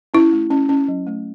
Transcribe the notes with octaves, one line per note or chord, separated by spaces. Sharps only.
C#4 E4
A3
C#4
C#4
F#3
A3